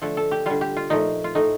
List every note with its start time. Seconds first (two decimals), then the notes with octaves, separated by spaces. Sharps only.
0.02 D3 F3 A3 A4
0.17 A4
0.31 G4
0.46 D3 G3 F4
0.61 G4
0.77 F4
0.90 A#2 F3 A3 D#4
1.24 F4
1.35 A2 A3 D#4